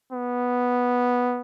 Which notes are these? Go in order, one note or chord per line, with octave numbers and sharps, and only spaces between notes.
B3